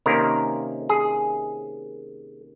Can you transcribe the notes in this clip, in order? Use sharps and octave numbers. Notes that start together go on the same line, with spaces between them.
C3 D#3 A#3 C#4 A#4
G#4